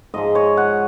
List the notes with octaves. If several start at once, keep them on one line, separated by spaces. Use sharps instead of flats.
G#2 F3 G#3 D#5
C#5
F#5